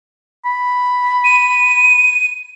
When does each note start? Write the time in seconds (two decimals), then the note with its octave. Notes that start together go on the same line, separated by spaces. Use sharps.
0.45 B5
1.24 D#7